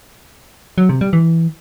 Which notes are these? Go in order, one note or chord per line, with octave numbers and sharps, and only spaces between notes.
F#3
C3
G3
E3